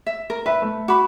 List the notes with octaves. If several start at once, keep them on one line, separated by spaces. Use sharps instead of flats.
E5
A#4
B4 E5
A3
F#4 B5 D6